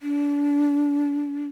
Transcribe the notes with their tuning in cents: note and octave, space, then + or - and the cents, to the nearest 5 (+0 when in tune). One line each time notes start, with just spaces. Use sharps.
D4 -30